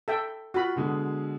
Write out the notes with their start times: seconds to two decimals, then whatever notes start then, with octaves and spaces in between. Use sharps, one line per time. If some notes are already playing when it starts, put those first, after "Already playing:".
0.08 A4 E5 G5
0.54 F4 F#4 B5
0.76 B2 D3 G#3